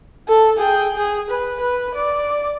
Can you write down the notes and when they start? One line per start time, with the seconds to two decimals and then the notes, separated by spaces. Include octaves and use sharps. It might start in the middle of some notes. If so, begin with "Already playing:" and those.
0.28 A4
0.58 G#4 G5
0.97 G#4
1.30 B4
1.60 B4
1.95 D5